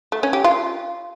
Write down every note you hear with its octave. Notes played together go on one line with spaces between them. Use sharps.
A3
C#4
G4
F4